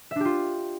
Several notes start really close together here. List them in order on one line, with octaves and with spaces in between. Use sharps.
E5 D4 G4 F4